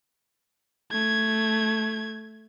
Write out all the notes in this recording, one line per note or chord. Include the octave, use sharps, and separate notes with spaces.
A3 G#6